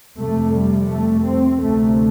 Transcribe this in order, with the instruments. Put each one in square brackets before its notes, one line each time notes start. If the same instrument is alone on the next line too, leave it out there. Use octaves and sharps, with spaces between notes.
[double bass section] F2 C3 A3
G3
A3
C4
D2 C3 A3